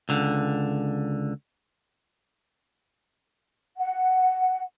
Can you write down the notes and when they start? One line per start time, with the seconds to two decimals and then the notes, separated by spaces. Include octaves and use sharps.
0.09 C#2 D3
3.79 F#5